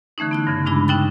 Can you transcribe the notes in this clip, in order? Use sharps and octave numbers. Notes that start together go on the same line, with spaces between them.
D3 E3 A3 C#4 D#4
B3 E4 F#6
G2 C#3 E3
G2 C#3 G#3 D4 E4 B5
C#4 D#4 E4 G5 F#6 A6